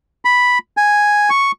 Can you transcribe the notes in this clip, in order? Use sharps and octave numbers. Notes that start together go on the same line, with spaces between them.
B5
G#5
C#6